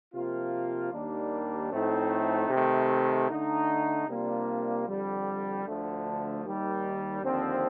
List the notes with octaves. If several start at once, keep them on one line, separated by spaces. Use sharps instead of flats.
C3 F3 A#3 F4
D#2 D#3 G3 A#3 D4
A2 F3 A3 C4 D#4
C3 D#3 A3
D3 A3 D#4
C3 G3 A#3 D4 F4
F2 D3 G3
D2 D3 F3 A3
D#2 D#3 G3
D#2 D3 F3 C4